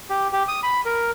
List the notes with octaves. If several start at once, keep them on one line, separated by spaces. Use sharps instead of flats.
G4
G4
D#6
B5
A#4